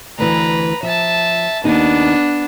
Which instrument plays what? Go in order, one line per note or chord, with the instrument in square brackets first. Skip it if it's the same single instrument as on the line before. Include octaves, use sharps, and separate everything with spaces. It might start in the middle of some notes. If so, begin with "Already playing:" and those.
[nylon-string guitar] D2 E3 [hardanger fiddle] B4 A#5
[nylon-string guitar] F3 [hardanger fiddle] E5 A5
[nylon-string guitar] D#2 D#4 [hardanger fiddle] B3 D4